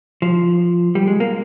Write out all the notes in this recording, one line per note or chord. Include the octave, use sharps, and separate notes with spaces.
F3
G3
G#3
A#3